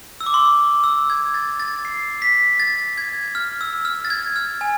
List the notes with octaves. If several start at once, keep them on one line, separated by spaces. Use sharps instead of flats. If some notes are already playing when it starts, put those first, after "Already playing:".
E6
D6
C6
D6
E6
G#6
A6
A6
C7
B6
A6
G#6
F6
E6
F6
A6
G#6
F6
G#5